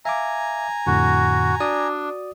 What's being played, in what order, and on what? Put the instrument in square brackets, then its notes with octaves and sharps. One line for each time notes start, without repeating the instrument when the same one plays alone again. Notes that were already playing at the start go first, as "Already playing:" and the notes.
[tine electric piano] E5 F5 D6 [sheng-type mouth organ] G#5 A#5
[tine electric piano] F2 A2 D3 [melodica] F#4
[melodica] D4 [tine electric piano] F#4 D5 D#6